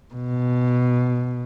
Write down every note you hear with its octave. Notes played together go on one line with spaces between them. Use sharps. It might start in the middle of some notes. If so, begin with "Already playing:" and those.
B2